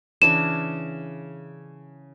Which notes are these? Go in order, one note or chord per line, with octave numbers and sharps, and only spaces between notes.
C#3 E3 D4 E7